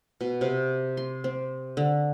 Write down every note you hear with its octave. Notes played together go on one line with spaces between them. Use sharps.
B2
C3
C6
C4
D3